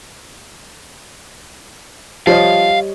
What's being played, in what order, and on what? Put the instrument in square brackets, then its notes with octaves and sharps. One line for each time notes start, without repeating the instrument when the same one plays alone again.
[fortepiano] F3 [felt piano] G3 C#5 D#5 [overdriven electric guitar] F5